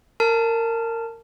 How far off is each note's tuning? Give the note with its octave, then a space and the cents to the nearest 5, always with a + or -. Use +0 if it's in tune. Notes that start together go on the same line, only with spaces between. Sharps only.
A#4 -20 A5 +0